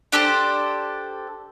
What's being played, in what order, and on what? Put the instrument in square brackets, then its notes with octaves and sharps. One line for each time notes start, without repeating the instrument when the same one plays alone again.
[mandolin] D4 G4 A4 C5